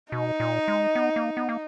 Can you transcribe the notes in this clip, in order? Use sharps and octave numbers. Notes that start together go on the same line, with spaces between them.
B2 D#4
A#2
G#3
B3
A#3
B3
A#3